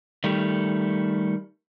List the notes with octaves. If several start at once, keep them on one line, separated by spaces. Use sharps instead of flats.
D#3 G3 A3